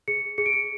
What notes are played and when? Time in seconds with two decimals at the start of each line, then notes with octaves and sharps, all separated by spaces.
0.08 G#4 C#7
0.38 G#4 C#7
0.46 D7
0.53 C#7